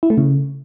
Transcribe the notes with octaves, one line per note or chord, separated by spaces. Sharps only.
E4
A3
C#3